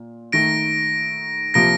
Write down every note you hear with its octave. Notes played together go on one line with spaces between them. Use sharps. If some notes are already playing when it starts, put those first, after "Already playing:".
Already playing: A#2
D#3 A3 D#4 A#6 D7
C3 F3 A#3 A#6 D7